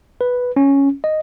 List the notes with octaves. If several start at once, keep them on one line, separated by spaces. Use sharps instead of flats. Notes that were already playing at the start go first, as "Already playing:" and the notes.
B4
C#4
D#5